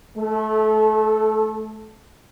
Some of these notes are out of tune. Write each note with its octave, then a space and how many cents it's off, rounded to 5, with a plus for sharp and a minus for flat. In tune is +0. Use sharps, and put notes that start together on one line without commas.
A3 -25 A4 +0